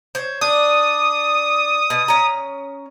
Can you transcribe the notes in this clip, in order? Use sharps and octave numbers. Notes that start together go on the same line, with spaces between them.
C5 C#5
D4 D#6
B2
C#4 A#5